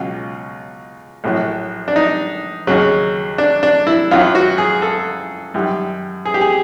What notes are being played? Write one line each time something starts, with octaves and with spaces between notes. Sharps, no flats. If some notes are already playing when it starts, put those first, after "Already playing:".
Already playing: C#2 B2 F#3 F4
A#1 A2 F#3
D4
D#4
D#2 C#3 F#3
D4
D4
E4
F#2 D#3 F#3 F4
F#4
G#4
A4
F#2 D#3 G3
G#4
G4
G#4